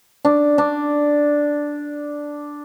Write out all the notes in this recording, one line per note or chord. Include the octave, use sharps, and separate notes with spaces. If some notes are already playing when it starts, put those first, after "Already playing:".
D4
D4